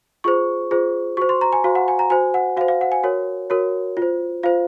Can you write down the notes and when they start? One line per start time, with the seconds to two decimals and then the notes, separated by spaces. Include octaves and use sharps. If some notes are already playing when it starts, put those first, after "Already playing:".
0.24 F4 G#4 C5 C#6
0.71 F4 G#4 C5
1.17 F#4 C5 C#6
1.29 C6
1.41 A#5
1.53 G#5
1.64 F#4 C5 F5
1.75 F#5
1.88 G#5
1.99 A#5
2.10 F#4 C5 G#5
2.34 F#5
2.57 F#4 F5
2.61 C5
2.68 F5
2.81 F#5
2.92 G#5
3.04 F#4 A#4 C#5
3.50 F#4 A#4 C#5
3.97 F4
4.02 C5
4.43 F4 C5 F5